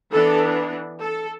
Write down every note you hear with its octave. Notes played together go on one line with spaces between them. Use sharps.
E3 B3 D4 A4
A4